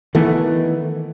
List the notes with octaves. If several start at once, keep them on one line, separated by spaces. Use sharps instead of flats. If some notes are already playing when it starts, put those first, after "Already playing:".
D#3 E3 A3 B3